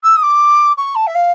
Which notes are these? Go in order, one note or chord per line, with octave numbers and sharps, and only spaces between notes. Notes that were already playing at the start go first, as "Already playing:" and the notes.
E6
D#6
D6
C#6
A5
E5
F5